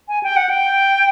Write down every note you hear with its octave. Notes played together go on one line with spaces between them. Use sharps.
G#5
G5
F#5
G5